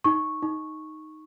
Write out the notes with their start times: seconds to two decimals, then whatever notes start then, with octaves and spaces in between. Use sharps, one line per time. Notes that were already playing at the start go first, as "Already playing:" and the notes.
0.04 D#4 C#6
0.43 D#4